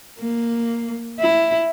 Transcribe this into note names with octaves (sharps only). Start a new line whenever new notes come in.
A#3
E4